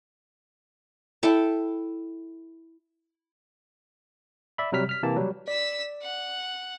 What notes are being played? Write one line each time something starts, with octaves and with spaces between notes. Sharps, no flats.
E4 A4 G5 A5
D5 E5 B5
C3 F#3 G3 F6 B6
F6 B6
C3 E3 A#3 A5
F#3 G3
D5 E6 B6
F#5